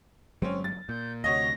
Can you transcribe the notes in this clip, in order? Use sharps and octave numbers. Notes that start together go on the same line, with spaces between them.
G1 F#3 G#3 C4 C#4
A6
A#2 G6
D2 C3 F#4 C#5 D#5 A#6